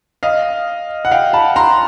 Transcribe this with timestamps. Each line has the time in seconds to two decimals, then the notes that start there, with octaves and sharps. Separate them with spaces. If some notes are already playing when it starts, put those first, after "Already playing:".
0.23 D#5 F5
1.05 F#5
1.11 F5 G5
1.33 A5 B5
1.56 A#5 C6